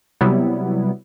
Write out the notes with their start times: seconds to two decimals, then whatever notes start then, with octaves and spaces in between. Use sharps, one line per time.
0.21 C3 F#3 G3 B3 E4